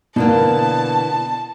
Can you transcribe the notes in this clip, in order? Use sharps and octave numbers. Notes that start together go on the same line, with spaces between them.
B2 D3 E3 A#3 A5